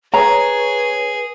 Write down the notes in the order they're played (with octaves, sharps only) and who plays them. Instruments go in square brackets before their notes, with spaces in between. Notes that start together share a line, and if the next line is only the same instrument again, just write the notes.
[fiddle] G#4 [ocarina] B4 [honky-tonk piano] C#5 [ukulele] A#5